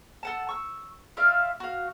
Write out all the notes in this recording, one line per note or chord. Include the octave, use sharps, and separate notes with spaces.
A4 F#5 A5
C#6 E6
F4 D5 E5 F5
F#4 F5